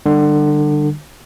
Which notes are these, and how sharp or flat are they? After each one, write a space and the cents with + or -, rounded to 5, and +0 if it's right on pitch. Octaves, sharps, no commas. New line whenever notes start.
D3 +25 G3 +15